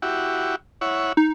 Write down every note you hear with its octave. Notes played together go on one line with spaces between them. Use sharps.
E4 F#4 G4
E4 C#5 F#5
D#4